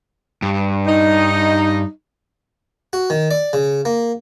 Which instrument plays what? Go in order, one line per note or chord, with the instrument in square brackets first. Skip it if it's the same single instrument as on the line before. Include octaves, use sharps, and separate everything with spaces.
[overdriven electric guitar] G2
[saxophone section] D#4
[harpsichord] F#4
D#3
D5
C#3
A#3